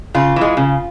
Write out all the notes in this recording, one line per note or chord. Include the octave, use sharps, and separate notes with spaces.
C#3 F4
E3 G#3
C#3